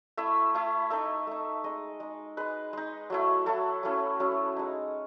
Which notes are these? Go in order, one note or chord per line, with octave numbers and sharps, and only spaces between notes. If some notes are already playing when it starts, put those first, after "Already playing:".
A3 E4 E5
A3 E4
A3 D#4 E5
A3 D#4
G#3 D#4 D#5
G#3 D#4
G#3 D#4 B4
G#3 D#4
F#3 A3 E4
F#3 A3 E4 A4
F#3 A3 C#4 E4
F#3 A3 C#4 E4 A4
G#3 D#4